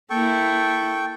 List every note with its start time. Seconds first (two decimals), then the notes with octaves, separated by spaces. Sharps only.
0.10 A#3 E4 A4 G5 C#6